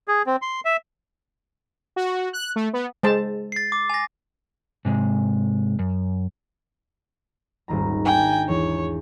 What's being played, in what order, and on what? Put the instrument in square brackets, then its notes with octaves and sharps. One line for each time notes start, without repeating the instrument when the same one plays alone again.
[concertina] G#4
C4
C6
E5
[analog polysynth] F#4
F#6
A3
B3
[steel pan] G#3 C5 A5
[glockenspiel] A6 C7
D6
G#5 A#6
[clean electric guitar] G#2 C3 G#3
F#2
[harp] D#1 G#1 A#5
[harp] D4 A#5 [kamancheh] G5 G#5
[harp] E2 [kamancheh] C#5